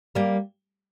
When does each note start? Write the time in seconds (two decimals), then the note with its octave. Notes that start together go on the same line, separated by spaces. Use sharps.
0.15 G3 A#3